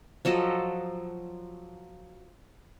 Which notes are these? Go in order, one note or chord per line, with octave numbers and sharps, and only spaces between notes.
F3 F#3 A4 D#5